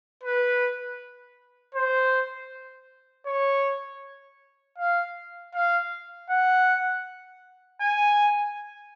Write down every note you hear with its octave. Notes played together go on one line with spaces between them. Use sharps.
B4
C5
C#5
F5
F5
F#5
G#5